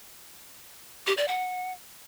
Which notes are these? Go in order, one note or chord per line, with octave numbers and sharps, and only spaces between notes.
G4
D5
F#5